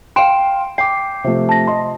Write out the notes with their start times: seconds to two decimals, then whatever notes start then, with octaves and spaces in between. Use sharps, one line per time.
0.16 F5 G5 C6 D7 E7
0.78 G5 D6 C7
1.24 C3 F3 A3
1.49 A5 A#6
1.67 D#5 C6